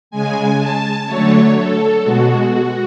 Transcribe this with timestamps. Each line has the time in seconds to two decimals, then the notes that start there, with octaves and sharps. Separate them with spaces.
0.11 C#3 G#3 G#5
0.58 A5
1.06 D3 F#3 A3 C#5
1.54 A4
2.02 B2 G#3 F#4
2.49 F#4